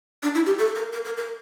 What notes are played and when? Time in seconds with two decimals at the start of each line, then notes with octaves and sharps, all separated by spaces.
0.23 D4
0.35 E4
0.46 G4
0.58 A4
0.75 A#4
0.93 A#4
1.05 A#4
1.17 A#4